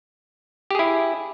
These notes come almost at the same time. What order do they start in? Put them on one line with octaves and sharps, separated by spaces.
G4 G#4 E4